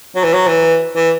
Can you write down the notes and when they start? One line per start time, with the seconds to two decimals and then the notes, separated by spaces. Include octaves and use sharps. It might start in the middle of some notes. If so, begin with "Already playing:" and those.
0.16 F#3
0.24 E3
0.33 F#3
0.48 E3
0.96 E3